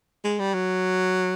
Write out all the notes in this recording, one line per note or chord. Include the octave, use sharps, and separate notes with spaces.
G#3
G3
F#3